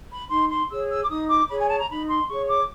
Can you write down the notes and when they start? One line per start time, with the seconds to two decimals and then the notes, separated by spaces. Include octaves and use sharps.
0.11 B5
0.30 D#4 C6
0.50 C6
0.70 G#4 C#5 E6
0.89 E6
1.04 D6
1.09 D#4 D#6
1.29 D6
1.49 G#4 C#5 B5
1.60 G#5
1.69 A5
1.79 A#5
1.89 D#4 B5
2.09 C6
2.28 G#4 C#5 C#6
2.48 D6